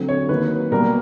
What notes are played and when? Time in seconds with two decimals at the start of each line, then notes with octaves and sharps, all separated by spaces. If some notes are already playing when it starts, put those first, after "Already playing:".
Already playing: D3 F#3 A3 C4
0.09 C#5
0.29 D#3 F#3 A#3 B4
0.72 B2 G3 A#3 A#4